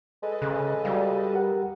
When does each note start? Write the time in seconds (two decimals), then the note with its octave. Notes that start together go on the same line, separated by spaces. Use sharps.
0.23 G#3 A4 B4 D#5
0.42 C#3 F#6
0.85 G3 F#4 F5
1.33 G4 A#4 F#5